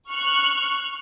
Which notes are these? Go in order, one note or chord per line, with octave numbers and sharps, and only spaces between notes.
C#6 F6 F#6